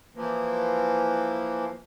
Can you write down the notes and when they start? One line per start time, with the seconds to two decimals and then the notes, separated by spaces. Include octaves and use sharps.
0.15 E3 F3 A#3